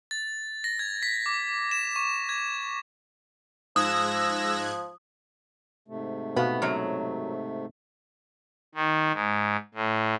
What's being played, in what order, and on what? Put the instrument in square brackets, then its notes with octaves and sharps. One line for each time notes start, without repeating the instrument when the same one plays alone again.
[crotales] A6
A#6
G#6
B6
D6
E7
C#6
G#6
[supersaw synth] G#2 F#6 G#6 [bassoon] F3 [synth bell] D#6 [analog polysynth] E6 A#6
[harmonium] G#2 C3 A3
[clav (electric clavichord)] B2 F5 [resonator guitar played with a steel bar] B3
[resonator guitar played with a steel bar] F#2 F#3
[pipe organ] D#3
G#2
A2